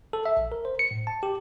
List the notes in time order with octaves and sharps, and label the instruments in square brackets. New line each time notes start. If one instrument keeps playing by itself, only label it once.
[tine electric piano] A4
E5
A#1
A#4
C5
C#7
A2
A5
G4